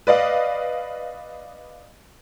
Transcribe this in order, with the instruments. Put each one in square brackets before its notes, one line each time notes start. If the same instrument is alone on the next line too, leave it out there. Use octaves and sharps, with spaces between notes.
[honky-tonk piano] B4 D5 D#5 F5